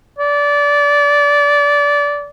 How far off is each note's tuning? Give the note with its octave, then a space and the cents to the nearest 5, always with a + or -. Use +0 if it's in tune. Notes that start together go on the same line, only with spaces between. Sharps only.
D5 -20